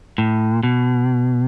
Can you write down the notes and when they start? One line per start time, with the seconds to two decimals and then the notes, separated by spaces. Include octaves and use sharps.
0.18 A2
0.63 B2